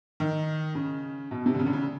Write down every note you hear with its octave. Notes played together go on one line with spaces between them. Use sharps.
D#3
C#3
B2
C3
D3
C#3
D3
C#3